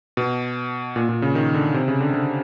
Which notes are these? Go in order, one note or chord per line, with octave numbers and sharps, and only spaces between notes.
B2
A#2
A#2
C#3
D#3
D3
C3
C#3
D3
D3